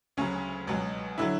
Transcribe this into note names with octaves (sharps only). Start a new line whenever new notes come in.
D2 C#3 F#3 C#4
C#2 B2 F#3
D3 F#3 E4